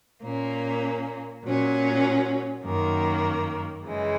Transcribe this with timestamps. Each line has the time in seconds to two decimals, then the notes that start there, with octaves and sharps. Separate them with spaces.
0.22 A#2 A#3 C#4
1.43 A#2 F#3 C#4
2.64 F#2 D#3 A#3
3.84 F#2 C#3 E3 G#3